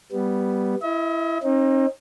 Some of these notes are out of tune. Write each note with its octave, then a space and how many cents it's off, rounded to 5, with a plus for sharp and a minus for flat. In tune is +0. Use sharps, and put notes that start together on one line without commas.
G3 +0 B3 +0
E4 +15 D#5 +45
C4 +45 D#4 +0